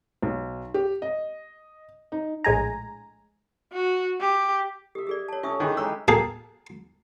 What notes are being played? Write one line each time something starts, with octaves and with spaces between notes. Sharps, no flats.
B1
G4
D#5
D#4
A#1 A2 G#3 G#5 A#5
F#4
G4
G4 D#5 E5
G4 G#4 D5
C#5 A5
C#4 F4 A4 E5 D#6
D#3 E3 G4 G#4 B4
G#3 C#5 A#5 C#6 E6
A#3 G#4 A4 F5 G5